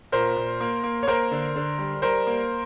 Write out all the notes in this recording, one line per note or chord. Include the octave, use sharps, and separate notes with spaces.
A#2 A#4 C5
A#2
A#3
A#3
C#5
A#3 A#4 C5
D3
D3
G3
G3 A#4 C5
A#3